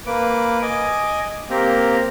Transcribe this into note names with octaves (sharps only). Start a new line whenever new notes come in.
A#3 B4 D6
D#5 G#5 D6
A#3 C4 G4 A#4